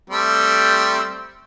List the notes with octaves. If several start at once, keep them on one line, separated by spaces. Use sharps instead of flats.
G3 A3 C4